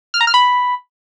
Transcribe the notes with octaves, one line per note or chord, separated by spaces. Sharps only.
F6
A#5
F6
B5